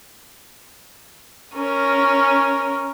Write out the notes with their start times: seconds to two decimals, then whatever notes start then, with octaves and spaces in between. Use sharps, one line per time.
1.56 C#4 A#4